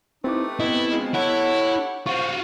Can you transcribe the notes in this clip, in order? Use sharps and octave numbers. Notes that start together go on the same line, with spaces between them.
A3 C4 D#4 E4 G4 B4 D6
B3 C4 E4 D#5
B2 F3 G#3
E4 G4 A4 C#5 F#5
F4 F#4 C5 C#6